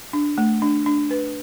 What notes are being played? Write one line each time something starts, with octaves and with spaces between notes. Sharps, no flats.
D4
A3
D4
D4
B4